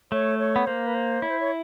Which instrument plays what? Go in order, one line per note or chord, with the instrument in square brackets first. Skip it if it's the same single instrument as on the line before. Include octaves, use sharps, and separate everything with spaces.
[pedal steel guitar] A3 [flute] C#5
[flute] C#5
[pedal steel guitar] B3
[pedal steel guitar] A#3 [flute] C5
[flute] B4
C5
[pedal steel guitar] E4 [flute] C#5
[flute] C5
C#5